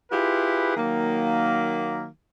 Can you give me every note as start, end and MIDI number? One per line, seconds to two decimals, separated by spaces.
0.11 0.74 64
0.11 0.74 65
0.11 0.74 67
0.11 0.74 68
0.11 0.74 71
0.77 2.08 51
0.77 2.08 54
0.77 2.08 58